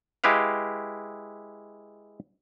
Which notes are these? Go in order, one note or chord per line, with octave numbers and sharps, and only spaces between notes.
G#3 E4 G4 B4 F5